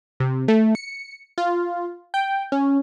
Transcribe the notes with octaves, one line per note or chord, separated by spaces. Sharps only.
C3
A3
C#7
F4
G5
C#4